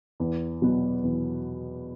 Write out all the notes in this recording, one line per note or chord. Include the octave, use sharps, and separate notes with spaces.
E2
B2 F#3 B3
E2